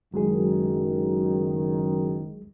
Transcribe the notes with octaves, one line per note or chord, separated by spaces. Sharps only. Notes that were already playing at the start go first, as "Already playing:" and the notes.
F#1 F#2 D#3 F#3 G#3 G#4